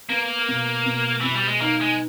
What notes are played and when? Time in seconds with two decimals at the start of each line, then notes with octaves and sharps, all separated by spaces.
0.09 A#3 B3
0.48 B2
0.86 B2
1.21 B2 E3
1.35 G3
1.48 G#3
1.61 A#3 D#4
1.81 G#3